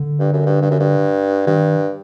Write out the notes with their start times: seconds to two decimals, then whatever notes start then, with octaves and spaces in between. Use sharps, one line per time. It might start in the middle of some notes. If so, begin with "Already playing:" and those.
Already playing: D3
0.19 G2
0.33 F#2
0.46 G2
0.62 G2
0.71 F#2
0.79 G2
1.47 G2 D#3